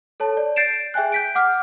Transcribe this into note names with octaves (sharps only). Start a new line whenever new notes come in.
A4 C#5 A5
D5
G6 A6 C7 D7 E7
G#4 E5 G5 G#5 F#6
G6 B6 D7
F#5 D6 F6